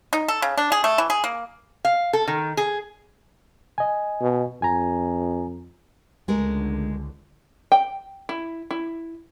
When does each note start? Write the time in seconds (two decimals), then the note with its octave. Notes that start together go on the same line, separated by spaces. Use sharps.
0.13 D#4
0.28 A4
0.42 C#3
0.58 D4
0.72 G#4
0.84 A3
0.98 E3
1.10 G#4
1.24 A#3
1.85 F5
2.13 A4
2.27 D#3
2.57 G#4
3.78 D#5 G#5
4.22 B2
4.62 F2 G#5 A#5
6.28 C#2 D3 G#3 A3 A#4
7.72 G5
8.29 E4
8.71 E4